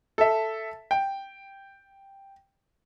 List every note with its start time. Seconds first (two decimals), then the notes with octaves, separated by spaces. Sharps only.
0.18 A4 E5
0.91 G5